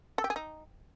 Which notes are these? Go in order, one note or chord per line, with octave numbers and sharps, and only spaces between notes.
A4
G4
G#4
D#4